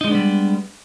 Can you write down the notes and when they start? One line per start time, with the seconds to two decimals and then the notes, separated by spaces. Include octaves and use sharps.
0.01 D#4
0.04 G#3
0.08 D4
0.11 B3
0.15 G3